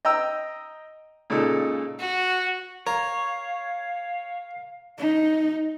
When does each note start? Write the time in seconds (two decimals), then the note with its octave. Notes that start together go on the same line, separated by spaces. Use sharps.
0.05 D#5 G5 A#5 E6
1.30 A#2 C#3 G#3 D#4 A4
2.00 F#4
2.87 A#4 C#5 F5
4.98 D#4